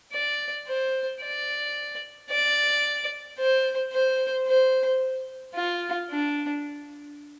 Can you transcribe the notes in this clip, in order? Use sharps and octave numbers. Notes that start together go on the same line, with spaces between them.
D5
C5
D5
D5
C5
C5
C5
F4
D4